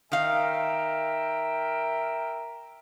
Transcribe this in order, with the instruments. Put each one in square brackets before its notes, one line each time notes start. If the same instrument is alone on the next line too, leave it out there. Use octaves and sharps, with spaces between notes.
[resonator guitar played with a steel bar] D#3 F5 [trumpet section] A#4 E5 G5